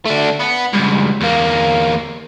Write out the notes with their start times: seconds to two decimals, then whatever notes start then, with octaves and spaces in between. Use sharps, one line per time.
0.05 A3 D4
0.40 B3 F#5
0.73 C#2 G2
1.21 E2 A#3